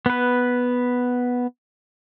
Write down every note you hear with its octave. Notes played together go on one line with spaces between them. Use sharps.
B3 B4